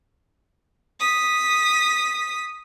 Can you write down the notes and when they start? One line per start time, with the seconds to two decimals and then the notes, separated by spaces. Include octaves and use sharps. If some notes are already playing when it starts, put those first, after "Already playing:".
1.00 D#6 B6